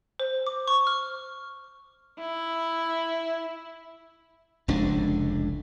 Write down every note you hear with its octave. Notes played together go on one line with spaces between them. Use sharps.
C5
D6
C#6
F6
E4
F1 C#2 A2 D4